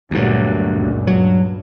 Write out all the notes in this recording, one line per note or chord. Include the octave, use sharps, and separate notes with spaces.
D2 G2 A#2 F#3
C#2 F#2 A#2
G2 F#3